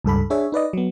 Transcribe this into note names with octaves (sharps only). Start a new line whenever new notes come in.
C#2 G2 A4 B5
D4 G#4 C#5 E5
D#4 B4 D5 D#5
F#3 B3